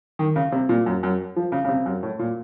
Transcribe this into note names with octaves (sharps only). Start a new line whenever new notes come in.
D#3
C#3
C3
A#2
F#2
F#2
F3
C#3
C#3
C3
F#2
A2
A#2